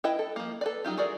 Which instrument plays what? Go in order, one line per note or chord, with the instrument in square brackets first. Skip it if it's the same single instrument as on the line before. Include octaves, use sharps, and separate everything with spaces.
[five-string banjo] E4 B4 D#5 G5
A4
F3 A#3
A4 B4 D5
F#3 D#4 F4 G4
E3 F#4 G#4 A#4 D5